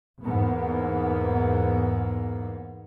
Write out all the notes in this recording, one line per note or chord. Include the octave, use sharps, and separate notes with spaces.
E2 G#2 A#3 B3